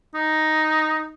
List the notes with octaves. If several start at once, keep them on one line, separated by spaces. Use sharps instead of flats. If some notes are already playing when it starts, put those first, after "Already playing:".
D#4